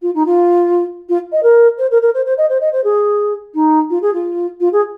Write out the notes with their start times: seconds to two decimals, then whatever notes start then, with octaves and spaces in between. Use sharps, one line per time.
0.02 F4
0.15 D#4
0.26 F4
1.09 F4
1.32 D#5
1.43 A#4
1.78 C5
1.91 A#4
2.02 A#4
2.15 C5
2.26 C5
2.38 D#5
2.49 C5
2.61 D#5
2.73 C5
2.84 G#4
3.54 D#4
3.90 F4
4.02 G#4
4.14 F4
4.61 F4
4.73 G#4